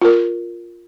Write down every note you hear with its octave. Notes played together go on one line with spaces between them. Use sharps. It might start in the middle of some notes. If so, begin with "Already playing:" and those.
F4 A#4